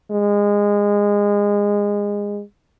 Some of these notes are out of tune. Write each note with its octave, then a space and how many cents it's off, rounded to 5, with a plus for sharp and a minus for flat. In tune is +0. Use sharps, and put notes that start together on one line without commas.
G#3 -20